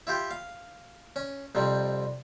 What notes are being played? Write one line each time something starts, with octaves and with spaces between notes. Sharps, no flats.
E4 F4 G4
F5
C#4
F2 C3 G3